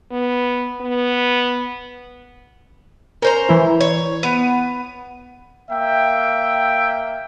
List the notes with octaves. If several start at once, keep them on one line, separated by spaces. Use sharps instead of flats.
B3
B3
C#4 A#4 C5 A#5
E3 E4
C#5
B3 D#7
A#3 E5 G5